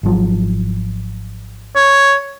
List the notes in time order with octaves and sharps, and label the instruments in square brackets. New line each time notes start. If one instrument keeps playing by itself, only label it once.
[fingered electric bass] G#1 F3 F#3
[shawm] C#5